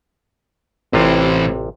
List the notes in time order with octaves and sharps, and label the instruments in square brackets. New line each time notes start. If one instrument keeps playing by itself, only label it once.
[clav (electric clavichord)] A1 C3 F4 [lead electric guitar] A2 E3 [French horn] C4